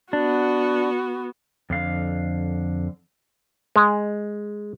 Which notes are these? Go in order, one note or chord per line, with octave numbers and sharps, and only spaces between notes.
B3 D4 F#4
F2 D3 F5
G#3